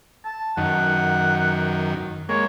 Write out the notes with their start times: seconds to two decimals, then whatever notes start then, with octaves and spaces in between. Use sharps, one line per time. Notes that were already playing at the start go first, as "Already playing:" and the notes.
0.25 A5
0.57 F#2 D#3 F#5
2.29 G#3 A#3 C#5